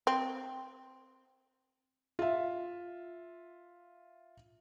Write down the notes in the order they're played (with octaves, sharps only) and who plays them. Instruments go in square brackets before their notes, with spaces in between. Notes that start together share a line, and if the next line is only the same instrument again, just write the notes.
[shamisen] C4
[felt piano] F4 E5